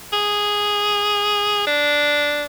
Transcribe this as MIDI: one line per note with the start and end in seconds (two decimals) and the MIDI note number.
0.13 1.66 68
1.67 2.45 62